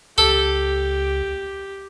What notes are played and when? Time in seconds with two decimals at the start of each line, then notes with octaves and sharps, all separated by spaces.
0.18 C#2 G4 A4